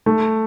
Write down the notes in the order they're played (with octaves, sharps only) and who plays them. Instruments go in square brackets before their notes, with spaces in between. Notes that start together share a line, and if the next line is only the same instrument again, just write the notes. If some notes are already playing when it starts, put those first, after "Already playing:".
[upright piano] A3